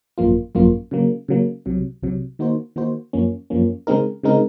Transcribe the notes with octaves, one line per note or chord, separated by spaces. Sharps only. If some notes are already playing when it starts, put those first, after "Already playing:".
G#1 F#2 F3 A#3 F4
G#1 F#2 F3 A#3 F4
C#3 F#3 A#3
C#3 F#3 A#3
C2 C3 F#3
C2 C3 F#3
D#3 A#3 D#4 F#4 C5
D#3 A#3 D#4 F#4 C5
F#2 F3 A#3 C#4
F#2 F3 A#3 C#4
C#3 G#3 C4 D#4 A#4
C#3 G#3 C4 D#4 A#4